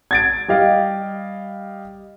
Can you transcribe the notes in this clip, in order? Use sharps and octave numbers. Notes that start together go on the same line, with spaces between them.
G#6 A6 D7
G3 G4 D#5 F5